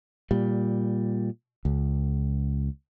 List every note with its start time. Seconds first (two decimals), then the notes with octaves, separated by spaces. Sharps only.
0.31 A#2 G3
1.65 C#2